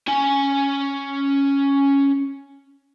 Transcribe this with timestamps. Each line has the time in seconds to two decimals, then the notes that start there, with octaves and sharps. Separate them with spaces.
0.08 C#4 G#5